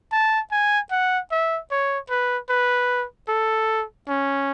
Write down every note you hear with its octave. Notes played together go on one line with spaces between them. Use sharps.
A5
G#5
F#5
E5
C#5
B4
B4
A4
C#4